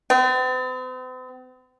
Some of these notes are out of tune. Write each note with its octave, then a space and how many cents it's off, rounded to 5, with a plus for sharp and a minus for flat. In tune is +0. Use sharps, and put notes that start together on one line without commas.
C4 -45